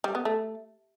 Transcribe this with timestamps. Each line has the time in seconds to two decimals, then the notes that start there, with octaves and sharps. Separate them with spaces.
0.04 G3
0.15 B3
0.25 A3